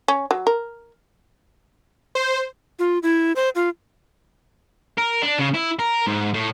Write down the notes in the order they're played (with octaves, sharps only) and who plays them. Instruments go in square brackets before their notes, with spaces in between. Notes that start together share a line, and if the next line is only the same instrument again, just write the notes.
[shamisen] C#4
F#3
A#4
[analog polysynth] C5
[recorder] F4
E4
C5
F4
[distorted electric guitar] A#4
D4
C#3
E4
A#4
G#2
A2